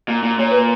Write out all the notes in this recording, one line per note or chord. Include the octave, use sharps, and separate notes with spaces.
A#2
A#2
A#2 C#5
B4